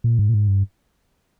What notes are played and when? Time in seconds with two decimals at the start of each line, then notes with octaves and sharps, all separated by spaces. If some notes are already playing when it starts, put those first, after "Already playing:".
0.04 A#2
0.19 G#2
0.29 A#2
0.34 G#2
0.48 G2